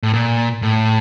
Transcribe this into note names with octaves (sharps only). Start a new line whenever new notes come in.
A2
A#2
A2